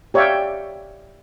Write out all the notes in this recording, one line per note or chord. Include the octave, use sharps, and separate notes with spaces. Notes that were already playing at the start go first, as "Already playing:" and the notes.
G4 C#5 D5 E5 F5 G5